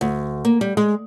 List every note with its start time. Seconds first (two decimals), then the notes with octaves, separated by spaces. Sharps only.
0.01 D2
0.45 A#3
0.61 G3
0.77 G#3